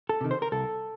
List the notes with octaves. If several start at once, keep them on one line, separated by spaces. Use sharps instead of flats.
A4
C3 D#3
C5
A#4
C2 A4